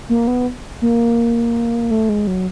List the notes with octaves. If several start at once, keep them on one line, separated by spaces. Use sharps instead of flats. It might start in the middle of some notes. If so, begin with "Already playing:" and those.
A#3
B3
A#3
A3
G#3
F#3